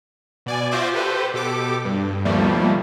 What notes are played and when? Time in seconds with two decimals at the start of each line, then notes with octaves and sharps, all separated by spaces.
0.46 B2 D5 G#5
0.71 F4 F#4 C5 E5 C6 D6
0.93 G4 A4 B4 C5
1.34 B2 G4 A4 D6
1.85 G2
2.25 D#2 B2 F3 G3 A3 A#3